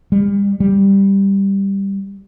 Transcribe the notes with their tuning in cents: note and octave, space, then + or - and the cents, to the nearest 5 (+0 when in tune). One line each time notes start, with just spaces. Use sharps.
G3 +40
G3 +5